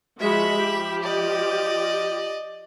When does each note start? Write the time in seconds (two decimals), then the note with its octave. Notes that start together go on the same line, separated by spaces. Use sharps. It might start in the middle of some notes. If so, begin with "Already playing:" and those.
0.20 F3 G#3 F#4 E5 B5
0.55 F3 G4
1.03 D5 D#5